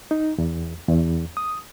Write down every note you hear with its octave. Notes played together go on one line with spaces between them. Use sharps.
D#4
E2
E2
D#6